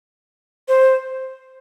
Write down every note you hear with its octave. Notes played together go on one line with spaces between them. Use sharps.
C5